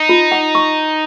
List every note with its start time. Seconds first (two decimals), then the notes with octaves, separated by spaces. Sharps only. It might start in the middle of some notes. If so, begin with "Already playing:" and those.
Already playing: D#4
0.09 F4
0.32 F#5
0.55 C#6